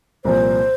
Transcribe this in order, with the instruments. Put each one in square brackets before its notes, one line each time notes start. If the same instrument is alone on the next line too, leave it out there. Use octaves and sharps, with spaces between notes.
[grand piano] C2 A#2 F3 A#3 [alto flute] C5